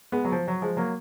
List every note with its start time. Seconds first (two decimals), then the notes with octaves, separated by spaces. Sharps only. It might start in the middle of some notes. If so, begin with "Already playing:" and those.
0.12 G#3 B3
0.24 F#3
0.32 F3
0.48 F#3
0.62 F3 G#3
0.77 F#3 A#3